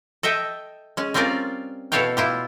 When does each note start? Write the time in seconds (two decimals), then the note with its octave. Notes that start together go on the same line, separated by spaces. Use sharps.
0.23 A4 D#5 E5 G5
0.97 G#3 C#4
1.14 G3 C4 C#4 F4 A#4 D5
1.92 B2 E4 A4 C#5 F5 G5
2.17 E4 F4 G4